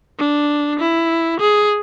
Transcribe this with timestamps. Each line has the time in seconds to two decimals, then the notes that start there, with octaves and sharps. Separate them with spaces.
0.19 D4
0.80 E4
1.40 G#4